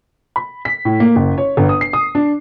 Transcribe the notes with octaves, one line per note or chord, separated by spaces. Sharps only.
B5
B6
A2
A#3
F#1
C#5
G1
D#6
C7
D#6
D4